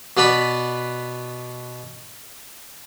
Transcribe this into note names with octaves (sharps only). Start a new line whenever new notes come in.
B2 B3 B4 D5 B5